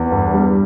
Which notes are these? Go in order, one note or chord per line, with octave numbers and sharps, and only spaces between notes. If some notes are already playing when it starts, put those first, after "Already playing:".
Already playing: E2
G2
G3